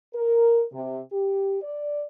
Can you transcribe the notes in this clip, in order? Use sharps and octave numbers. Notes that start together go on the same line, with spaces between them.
A#4
C3
G4
D5